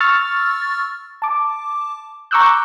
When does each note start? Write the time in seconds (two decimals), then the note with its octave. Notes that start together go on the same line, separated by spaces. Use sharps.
0.01 C#6 E6 F6 A6
1.22 A5 D6
2.31 A#5 C#6 D6 E6 F#6 G6